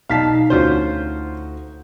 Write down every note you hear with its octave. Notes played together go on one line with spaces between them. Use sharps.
B1 D#4 F5 A5 B6
D2 C#4 F4 F#4 C5 G6